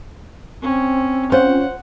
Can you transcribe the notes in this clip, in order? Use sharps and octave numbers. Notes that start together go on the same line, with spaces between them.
C4 C#4
C#4 F4 C5 F#5